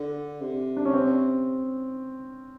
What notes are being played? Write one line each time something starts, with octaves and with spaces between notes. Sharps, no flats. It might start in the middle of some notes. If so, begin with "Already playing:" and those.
Already playing: D3
C3
D4
C#4
C4